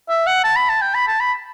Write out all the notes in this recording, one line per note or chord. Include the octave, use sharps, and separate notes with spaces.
E5
F#5
A5
B5
A5
G5
B5
A5
B5